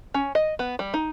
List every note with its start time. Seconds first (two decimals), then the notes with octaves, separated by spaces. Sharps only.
0.14 C#4
0.35 D#5
0.59 B3
0.79 G3
0.94 D#4